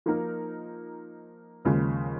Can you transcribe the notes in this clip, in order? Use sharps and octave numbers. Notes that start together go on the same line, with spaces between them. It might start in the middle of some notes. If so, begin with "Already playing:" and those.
F3 A#3 D#4 A#4
D#2 C#3 F3 G#3